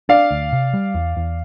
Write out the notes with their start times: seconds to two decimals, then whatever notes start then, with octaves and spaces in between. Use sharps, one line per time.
0.09 D4 D5 F5
0.31 D2
0.53 C3
0.73 G3
0.94 E2
1.16 E2